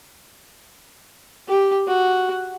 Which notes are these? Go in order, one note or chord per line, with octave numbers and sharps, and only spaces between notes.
G4
F#4